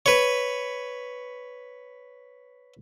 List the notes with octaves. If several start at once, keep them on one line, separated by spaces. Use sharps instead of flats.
B4 C#5